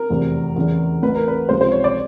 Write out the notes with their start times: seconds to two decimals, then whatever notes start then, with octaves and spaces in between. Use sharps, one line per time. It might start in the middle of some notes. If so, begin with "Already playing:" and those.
Already playing: A#4
0.10 F1 E2 C3 E3
0.56 E2 C#3 E3
1.02 A1 A2 E3 B4
1.16 A#4
1.28 B4
1.49 C#2 C3 F3 C5
1.61 C5
1.72 C#5
1.84 D5